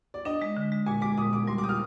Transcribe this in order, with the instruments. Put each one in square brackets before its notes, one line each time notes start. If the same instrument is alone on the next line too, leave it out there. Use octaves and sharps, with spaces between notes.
[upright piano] D5
[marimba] D4 [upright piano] D#5
[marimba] G#3
D3
G#3
[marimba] A#2 [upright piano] G#5
[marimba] G#3 [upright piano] D6
[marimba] A#2 [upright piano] D#6
[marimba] A#2 [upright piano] D6
[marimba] G3 [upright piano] C6
[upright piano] D6
[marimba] G4 [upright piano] D#6
[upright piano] F6